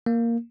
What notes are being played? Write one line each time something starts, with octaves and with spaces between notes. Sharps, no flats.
A#3